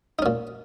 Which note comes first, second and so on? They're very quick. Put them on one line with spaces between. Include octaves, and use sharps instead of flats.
D#4 C#4 A#2